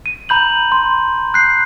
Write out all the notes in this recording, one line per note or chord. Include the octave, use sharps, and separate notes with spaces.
D#7
A#5 B5 G6 F#7
C6
F#6 G6 C7